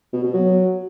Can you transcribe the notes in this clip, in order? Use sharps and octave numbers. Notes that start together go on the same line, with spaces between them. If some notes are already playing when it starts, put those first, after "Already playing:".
B2
B2
F#3